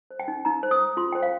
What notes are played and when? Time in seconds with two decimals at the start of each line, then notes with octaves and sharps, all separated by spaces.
0.11 C5
0.20 G5
0.28 D#4
0.45 D#4 A#5
0.63 C5
0.71 D#6
0.79 C5
0.97 F4 C6
1.12 C5 G5
1.23 F5